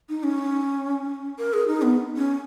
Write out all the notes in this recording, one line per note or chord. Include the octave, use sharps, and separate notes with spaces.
D#4
C#4
A#4
G#4
D#4
B3
C#4